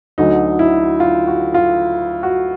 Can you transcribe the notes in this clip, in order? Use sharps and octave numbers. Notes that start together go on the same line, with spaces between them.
D2 D3 F#3 D#4
E4
F4
F#4
F4
F#4